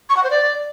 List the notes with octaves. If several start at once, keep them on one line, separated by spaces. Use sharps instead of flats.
C#6
F#5
C5
D5